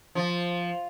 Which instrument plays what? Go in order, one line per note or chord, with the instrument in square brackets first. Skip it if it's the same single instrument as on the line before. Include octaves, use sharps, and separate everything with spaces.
[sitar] F3